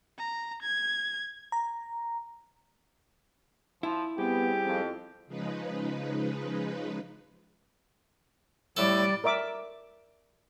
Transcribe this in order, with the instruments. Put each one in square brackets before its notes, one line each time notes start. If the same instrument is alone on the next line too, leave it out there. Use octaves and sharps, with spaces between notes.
[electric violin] A#5
G#6
[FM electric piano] A#5
[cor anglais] F3 [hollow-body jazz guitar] E4
[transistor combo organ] G3 C4 G#4 [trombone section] B3 [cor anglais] G4
[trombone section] F2
[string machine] C#3 F3 G#3 D#4 B4
[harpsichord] A2 A4 [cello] G3 D5
[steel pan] A#4 D5 E5 D6